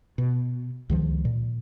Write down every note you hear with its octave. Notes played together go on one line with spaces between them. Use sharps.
B2
C#2 D#3 F3
A#2